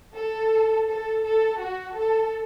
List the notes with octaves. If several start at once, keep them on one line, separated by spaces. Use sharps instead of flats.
A4
A4
A4
F#4
A4